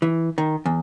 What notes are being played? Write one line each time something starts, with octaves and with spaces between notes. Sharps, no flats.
E3
D#3
E2